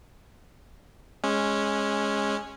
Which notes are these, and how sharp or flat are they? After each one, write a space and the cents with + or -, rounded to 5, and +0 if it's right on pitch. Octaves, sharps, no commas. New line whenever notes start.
G#3 +0 C#4 -10